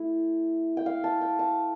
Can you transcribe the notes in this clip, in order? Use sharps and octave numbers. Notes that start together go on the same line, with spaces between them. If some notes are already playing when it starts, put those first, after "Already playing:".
Already playing: A3 E4
G5
F5
A5
G5
A5